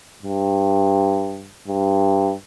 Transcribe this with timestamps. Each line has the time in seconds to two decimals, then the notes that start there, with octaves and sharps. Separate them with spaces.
0.23 G2
1.68 G2